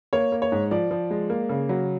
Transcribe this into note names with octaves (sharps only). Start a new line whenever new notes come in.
A#3 C#5
A#3
C#5
G#2
F3 D5
F3
G#3
A#3
C#3
F#3